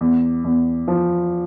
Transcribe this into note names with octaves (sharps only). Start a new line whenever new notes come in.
E2
E2
F3